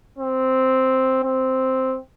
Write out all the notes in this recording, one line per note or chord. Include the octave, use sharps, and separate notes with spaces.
C4
C4